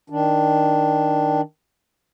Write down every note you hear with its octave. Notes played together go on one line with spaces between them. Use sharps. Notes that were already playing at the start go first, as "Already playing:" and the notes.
D#3 D4